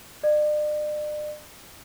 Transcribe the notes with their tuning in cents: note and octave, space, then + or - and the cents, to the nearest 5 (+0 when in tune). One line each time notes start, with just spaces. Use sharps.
D5 +40